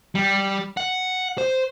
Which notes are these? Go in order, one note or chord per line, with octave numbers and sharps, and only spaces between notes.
G3
F#5
C5